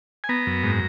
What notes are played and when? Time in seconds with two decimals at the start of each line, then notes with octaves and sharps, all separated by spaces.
0.24 G#5
0.29 B3 A#5
0.47 F#2
0.63 G#2